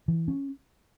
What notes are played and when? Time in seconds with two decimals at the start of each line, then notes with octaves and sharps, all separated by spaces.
0.08 E3
0.28 C#4